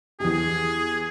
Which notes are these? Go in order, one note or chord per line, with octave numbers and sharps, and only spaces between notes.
E2 G4 G#4